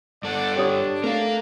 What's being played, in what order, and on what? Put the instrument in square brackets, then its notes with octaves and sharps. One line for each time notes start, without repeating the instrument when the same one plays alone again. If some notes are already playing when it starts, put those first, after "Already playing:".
[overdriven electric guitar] G2 A4 [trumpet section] D4 D5 F#5
[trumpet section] D4 [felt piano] G4 C#5 D#6
[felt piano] A3 [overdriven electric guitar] A#4 F5